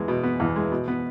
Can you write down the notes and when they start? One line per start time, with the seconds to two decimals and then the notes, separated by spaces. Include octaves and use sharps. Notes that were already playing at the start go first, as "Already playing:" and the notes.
Already playing: E2 G#3
0.08 B2
0.23 B3
0.40 E2
0.56 G#3
0.72 B2
0.88 B3